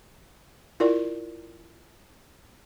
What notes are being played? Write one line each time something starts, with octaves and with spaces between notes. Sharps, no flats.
E4 F4 A#4 D5